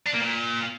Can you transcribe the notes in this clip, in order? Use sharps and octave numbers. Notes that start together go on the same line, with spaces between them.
D4
A#3
A#2